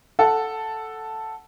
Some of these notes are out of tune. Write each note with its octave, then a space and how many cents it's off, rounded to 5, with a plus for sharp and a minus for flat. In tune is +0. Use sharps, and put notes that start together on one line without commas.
A4 +0 F#5 +0